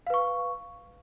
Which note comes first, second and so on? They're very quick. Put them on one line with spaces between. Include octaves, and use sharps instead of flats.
F5 B4 C#6